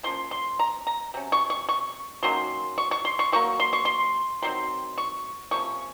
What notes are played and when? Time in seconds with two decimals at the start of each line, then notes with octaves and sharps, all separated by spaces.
0.03 C3 F3 A#3 C#4 C6
0.31 C6
0.59 A#5
0.87 A#5
1.14 C3 F#3 C#4
1.32 C#6
1.50 C#6
1.69 C#6
2.23 D#3 F#3 A#3 C#4 C6
2.78 C#6
2.91 C#6
3.05 C6
3.19 C#6
3.32 C3 F#3 A#3 C#6
3.60 C6
3.73 C#6
3.85 C6
4.42 C3 D#3 F#3 C4 C6
4.98 C#6
5.51 C3 F3 A#3 C#4 C#6